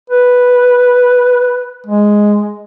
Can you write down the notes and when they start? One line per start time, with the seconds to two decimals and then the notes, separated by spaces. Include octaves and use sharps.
0.10 B4
1.87 G#3